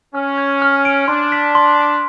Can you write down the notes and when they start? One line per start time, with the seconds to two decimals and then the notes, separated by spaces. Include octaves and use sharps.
0.15 C#4 F6
0.38 G#6
0.62 F6
0.85 D7
1.08 D4 C6
1.32 B6
1.55 C6
1.78 C6